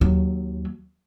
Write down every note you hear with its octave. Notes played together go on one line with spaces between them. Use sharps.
D#2 F#3